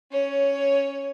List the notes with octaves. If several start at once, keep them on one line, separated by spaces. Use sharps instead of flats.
C#4 C#5